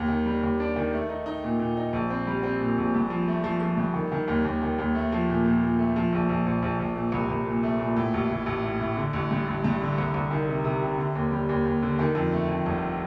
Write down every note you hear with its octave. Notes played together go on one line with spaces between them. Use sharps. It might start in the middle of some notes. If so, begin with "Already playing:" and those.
Already playing: D#2
D#3
G3
D#2
D4
D#3
A3
D#4
D#4
A#2
A#2
D#4
A#1
C4
G3
C4
A#2
A#1
G2
F3
A3
F3
F3
G2
D#3
D#3
D#2
D#2
D#3
D#2
A3
F3
A#2
A#2
A#2
A3
F3
A#1
A#1
A#1
A#1
A#1
A#2
C2
C2
A#2
A3
A#2
A2
A1
A1
A1
A2
A2
D3
A1
G2
A1
G2
D3
C2
C2
D#3
C3
C3
C3
D3
D#2
G3
D#2
D#2
D3
D#3
F2
A3
F2
G1